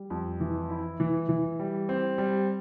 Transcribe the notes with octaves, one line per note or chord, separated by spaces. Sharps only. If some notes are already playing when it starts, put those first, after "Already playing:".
Already playing: G3
F2
E3
E4
E3
E3
G3
C4
G3